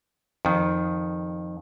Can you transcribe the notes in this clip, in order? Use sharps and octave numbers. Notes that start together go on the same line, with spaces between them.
F2 D#3